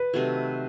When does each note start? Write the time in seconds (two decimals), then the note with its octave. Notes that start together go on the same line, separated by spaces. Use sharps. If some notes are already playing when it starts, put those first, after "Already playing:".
Already playing: B4
0.14 C3 D#3 F#3 A3